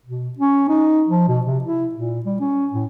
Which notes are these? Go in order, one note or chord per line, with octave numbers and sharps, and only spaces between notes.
B2
C#4
D#4
F3
B2
C3
E4
A#2
G3
C#4
A2